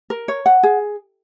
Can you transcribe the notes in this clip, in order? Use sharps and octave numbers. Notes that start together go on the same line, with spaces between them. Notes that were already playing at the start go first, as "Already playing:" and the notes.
A#4
C#5
F#5
G#4